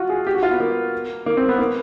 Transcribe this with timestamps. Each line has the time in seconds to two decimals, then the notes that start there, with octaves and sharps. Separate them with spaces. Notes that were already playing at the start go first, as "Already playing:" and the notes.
Already playing: F4 F#4
0.10 G#4
0.27 G4
0.34 F#4
0.43 F4
0.51 B3
0.60 A#3
1.26 A#3
1.37 C4
1.49 B3
1.58 A#3